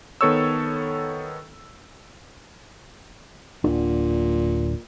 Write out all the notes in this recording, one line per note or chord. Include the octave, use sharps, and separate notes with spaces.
D#3 B3 A4 C#5 C#6 E6
D1 A#2 D4